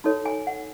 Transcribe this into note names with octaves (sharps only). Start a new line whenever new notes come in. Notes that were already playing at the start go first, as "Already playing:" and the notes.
D#4 F#4 A4 C#5
G#5
F#5